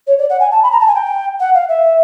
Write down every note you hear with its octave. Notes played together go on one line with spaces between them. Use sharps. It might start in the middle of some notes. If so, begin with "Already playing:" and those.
C#5
D5
F#5
G#5
A5
B5
A#5
A5
G#5
G5
F#5
F5
E5